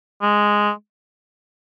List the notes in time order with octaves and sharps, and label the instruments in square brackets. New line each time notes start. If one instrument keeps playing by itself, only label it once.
[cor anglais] G#3